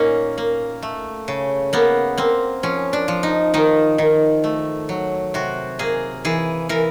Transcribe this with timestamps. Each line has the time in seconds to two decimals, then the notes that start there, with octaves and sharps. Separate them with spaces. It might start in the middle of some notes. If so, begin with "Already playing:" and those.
Already playing: A#2 A#3 C#4 D#4
0.38 A#3
0.83 A3
1.28 C#3
1.73 A#3 B3
2.17 A#3 C4
2.63 F3 C#4
2.93 D4
3.08 F3
3.23 D#4
3.54 D#3 D#4
3.98 D#3
4.44 A3
4.89 F#3
5.34 C3 F#4
5.79 A#3 G#4
6.25 E3 G#4
6.69 E3 A#4